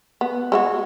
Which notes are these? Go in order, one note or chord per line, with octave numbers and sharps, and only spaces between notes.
B3
G#3 E4 F#4